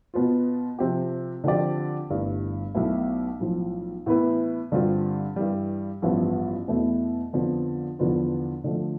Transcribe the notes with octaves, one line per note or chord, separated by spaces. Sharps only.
B2 B3 F4
C3 F3 C4 G4
D3 F3 C4 G4 D5
G1 G2 E3 A3 D4
B1 B2 A3 E4
B1 A2 F3
A2 E3 B3 E4 B4
G2 D3 G3 C4 F4
G2 E3 G3
A1 G2 F3 B3 E4
E2 B2 A3 E4
F2 D3 F3 B3
E2 D3 F3 B3 F4
D3 F3 A3